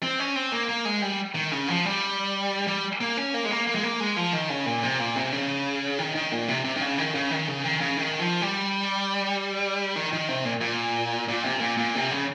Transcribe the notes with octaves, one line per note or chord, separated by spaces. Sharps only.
C4
C#4
C4
A#3
A#3
G#3
G3
D#3
C#3
F3
G3
G3
A#3
C#4
A#3
G#3
A#3
A#3
G#3
A#3
G#3
F3
D#3
C#3
A#2
C3
A#2
C3
C#3
D#3
D#3
A#2
C3
C3
D#3
C#3
D#3
C#3
D#3
C#3
D#3
C#3
D#3
F3
G3
D#3
D#3
C3
A#2
A#2
A#2
C3
A#2
A#2
C3
C#3